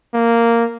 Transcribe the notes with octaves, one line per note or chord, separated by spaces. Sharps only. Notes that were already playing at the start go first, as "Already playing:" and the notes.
A#3